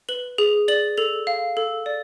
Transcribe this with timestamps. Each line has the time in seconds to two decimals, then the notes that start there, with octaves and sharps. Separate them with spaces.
0.09 B4 F#7
0.38 G#4 F7
0.68 D5 F#7
0.97 A4 F7
1.27 F5
1.57 A4
1.86 D5